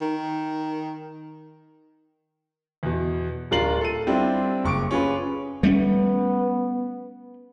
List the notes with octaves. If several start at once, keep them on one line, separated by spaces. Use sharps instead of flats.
D#3
E2 B2
D1 D4 F4 A#4 C7 F#7
A4 D#7
G3 C4 D4 E4 F4 G4
F#1 C#6 D6 D7
C#4 F4 G#4 B4
G3 A3 B3 C#4